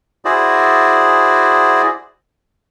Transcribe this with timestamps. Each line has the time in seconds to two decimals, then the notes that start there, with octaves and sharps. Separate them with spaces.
0.25 E4 F#4 G#4 C5 D5